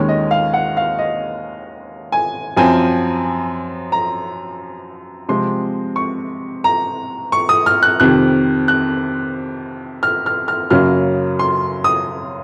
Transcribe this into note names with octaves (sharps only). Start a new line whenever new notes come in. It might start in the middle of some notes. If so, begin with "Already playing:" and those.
Already playing: D#2 D#3 G#3 C#4
D#5
F5
F#5
F5
D#5
G#5
F#2 F3 C4 G#5
A#5
C3 F3 G#3 C4 C6
C#6
A#5
C#6
D#6
F6
F#6
F2 C3 D#3 F#6
F#6
F6
F6
F6
F#2 C#3 F#3 A#3 F6
C6
D#6